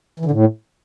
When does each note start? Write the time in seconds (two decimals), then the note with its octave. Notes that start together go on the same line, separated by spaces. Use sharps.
0.20 E3
0.25 D3
0.31 A2